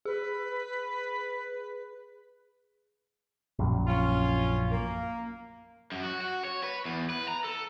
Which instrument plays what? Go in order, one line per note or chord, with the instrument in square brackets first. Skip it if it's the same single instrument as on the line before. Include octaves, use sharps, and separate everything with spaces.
[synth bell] G#4 [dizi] B4
[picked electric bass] A#1 F#2
[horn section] C#4 F4
A#3
[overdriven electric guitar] F#2
F#4
F#4
C#5
B4
E2
B4
A#5
A4